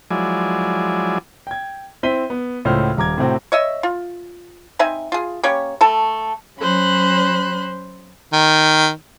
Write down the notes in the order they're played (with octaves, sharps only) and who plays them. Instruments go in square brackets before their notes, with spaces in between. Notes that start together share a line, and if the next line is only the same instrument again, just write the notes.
[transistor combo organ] F3 F#3 G#3 E4 D5 G#5
[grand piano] G5 G#6
C4 E4 C5 B6 D#7 G7
B3
C#2 A2 F3 C5 C#5 F6
D#1 A#5 D6 G#6
A2 C3 A3 C4 F#4
[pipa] C#5 D#5 E5
F4
C4 D#4 E5 G#5
F4 G#4
A#3 C#4 G4 C#5
A3 A4 A5
[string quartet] F#3 C#4 C5 B5 F#6
[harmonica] D#3